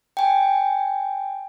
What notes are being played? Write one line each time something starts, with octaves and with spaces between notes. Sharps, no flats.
G5 G#5